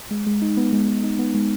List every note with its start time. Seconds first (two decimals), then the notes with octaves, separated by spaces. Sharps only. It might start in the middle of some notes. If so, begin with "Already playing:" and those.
0.11 G#3
0.26 G#3
0.42 D#4
0.57 B3
0.72 G#3
0.88 G#3
1.03 D#4
1.19 B3
1.34 G#3